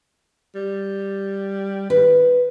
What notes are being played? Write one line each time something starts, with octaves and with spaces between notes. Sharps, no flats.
G3
D#3 B4